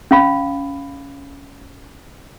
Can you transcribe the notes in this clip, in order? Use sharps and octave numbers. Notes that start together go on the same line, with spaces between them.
C#4 F5 B5